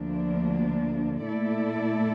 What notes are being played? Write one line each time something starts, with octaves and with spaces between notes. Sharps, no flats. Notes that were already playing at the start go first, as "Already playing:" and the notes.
Already playing: D2 D3 F3 A#3 D4
A#2 A3 E4 A4 D5